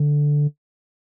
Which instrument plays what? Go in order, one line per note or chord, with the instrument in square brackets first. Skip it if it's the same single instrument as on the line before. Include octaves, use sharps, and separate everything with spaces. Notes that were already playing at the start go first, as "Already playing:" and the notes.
Already playing: [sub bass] D3